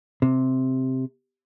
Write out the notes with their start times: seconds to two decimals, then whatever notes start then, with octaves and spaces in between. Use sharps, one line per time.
0.22 C3